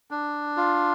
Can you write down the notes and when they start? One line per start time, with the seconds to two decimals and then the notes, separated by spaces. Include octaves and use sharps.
0.11 D4
0.57 F4